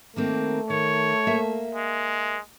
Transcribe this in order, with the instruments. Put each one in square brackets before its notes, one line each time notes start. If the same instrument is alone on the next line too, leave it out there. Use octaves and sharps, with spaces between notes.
[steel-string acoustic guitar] D#3 A#3 C4 [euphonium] A3
[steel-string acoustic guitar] D#3 [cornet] C#5
[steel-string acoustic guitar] A#3 E5
[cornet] G#3